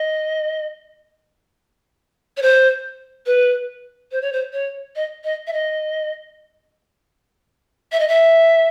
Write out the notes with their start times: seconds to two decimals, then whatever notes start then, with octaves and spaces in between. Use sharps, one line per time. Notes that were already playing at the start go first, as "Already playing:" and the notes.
Already playing: D#5
2.37 C#5
2.42 C5
3.26 B4
4.12 C5
4.22 C#5
4.32 C5
4.53 C#5
4.96 D#5
5.24 D#5
5.47 E5
5.53 D#5
7.92 E5
7.99 D#5
8.08 E5